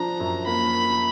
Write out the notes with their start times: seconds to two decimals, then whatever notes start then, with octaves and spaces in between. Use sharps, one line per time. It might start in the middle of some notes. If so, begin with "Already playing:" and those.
Already playing: F3 D4 A#5
0.20 F#2
0.47 A#3 B5